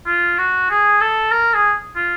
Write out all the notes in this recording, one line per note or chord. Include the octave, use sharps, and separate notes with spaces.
F4
F#4
G#4
A4
A#4
G#4
F4